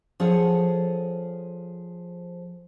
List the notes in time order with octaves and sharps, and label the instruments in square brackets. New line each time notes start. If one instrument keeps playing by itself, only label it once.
[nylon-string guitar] F3 G#4 A4 C#5 F#5